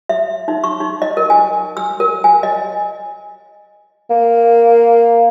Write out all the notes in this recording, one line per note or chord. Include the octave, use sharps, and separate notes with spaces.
E5
D#4
C#6
D#4
D#5
A#4
G#5
E6
A#4
G#5
D#5
A#3